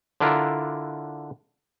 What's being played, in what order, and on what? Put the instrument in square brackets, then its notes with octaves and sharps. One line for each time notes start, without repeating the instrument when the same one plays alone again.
[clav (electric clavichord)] D3 D4 E4 F4 A#4